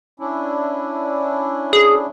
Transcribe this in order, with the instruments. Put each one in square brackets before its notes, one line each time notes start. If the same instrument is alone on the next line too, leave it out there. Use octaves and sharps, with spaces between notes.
[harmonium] C#4 D4 E4
[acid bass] G#4